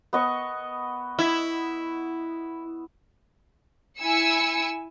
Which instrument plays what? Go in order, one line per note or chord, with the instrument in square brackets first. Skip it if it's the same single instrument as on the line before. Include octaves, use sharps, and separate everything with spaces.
[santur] B3 D#5 C#6
[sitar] E4
[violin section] E4 G#5 E6 C#7